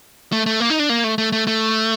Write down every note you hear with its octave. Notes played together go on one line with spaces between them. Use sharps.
A3
A3
A#3
D#4
D4
A#3
A3
A3
A3
A3